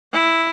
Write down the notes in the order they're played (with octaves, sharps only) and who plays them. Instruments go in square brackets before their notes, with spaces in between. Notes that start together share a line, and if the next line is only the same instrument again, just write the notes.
[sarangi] E4